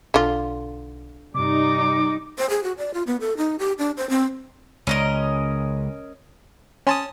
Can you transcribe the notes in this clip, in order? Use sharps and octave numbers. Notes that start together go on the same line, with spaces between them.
B1 D3 F4
G2 C3 G3 D#4 D6
C5
G#4
F#4
D5
F4
B3
A4
D#4
G4
D4
C5
C4
C#2 C#4 A#4 D#5
C#4 C#5 G#5 A5 C6 D#6